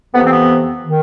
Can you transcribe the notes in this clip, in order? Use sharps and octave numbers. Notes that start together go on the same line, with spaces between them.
F2 C3 E3 B3
C4
B3
D#3